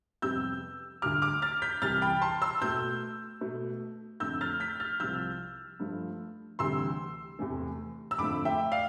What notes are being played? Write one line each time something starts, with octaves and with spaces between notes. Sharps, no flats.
F2 C3 G3 B3 E6 G6
D2 D3 G3 D6 F6
D6 F6
F6 A6
G6 B6
C2 C3 E3 G3 F6 A6
G5 B5
A5 C6
C6 E6
B2 A3 E6 G6
B2 A3
F2 D3 A3 E6 G6
F6 A6
G6 B6
F6 A6
C2 C3 F3 E6 G6
G2 F3 A3
D2 C3 E3 G3 C6 E6
E2 C3 E3 A3
E6
F2 D3 F3 A3 B5 D6
E5 G5
D5 F5